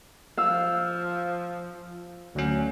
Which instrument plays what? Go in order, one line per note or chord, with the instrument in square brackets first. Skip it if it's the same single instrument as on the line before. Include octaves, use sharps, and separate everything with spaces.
[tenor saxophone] F3 [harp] F5 E6
[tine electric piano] D2 C#4 [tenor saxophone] F#3